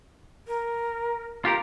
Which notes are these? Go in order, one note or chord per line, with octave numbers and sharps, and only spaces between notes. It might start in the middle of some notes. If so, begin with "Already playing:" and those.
A#4
F4 G4 A#4 D6